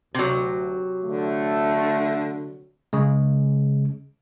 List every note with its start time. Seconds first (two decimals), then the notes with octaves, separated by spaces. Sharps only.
0.15 D2 C3 F#3
1.04 D3 A3
2.93 C#3 G#3